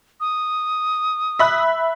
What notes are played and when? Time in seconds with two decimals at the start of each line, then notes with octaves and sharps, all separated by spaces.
0.20 D#6
1.39 E5 B5 F#6